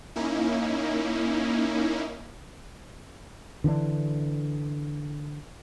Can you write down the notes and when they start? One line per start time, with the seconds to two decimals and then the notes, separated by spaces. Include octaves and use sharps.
0.16 A#3 C#4 D#4 E4
3.64 D3 E3 A3 D4